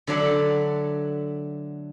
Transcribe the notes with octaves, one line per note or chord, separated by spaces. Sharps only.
D3 F#3 A3 D4 F#5 B5